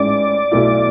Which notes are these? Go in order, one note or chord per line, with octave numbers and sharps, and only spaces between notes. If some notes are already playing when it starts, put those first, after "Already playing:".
Already playing: A1 G#2 G#3 C#4 E4 D5
B1 B2 A3 E4